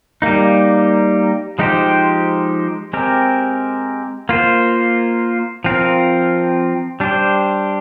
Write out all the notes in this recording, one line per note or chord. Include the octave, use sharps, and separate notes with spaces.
G3 A#3 D#4
F3 G#3 D#4 G4 C5
G#3 C4 G4 A#4
A#3 F4 C5
F3 C4 F4 A#4
G3 D4 G4 C5